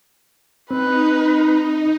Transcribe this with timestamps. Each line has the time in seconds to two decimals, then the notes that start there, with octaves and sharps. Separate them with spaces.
0.71 C4 D#4 B4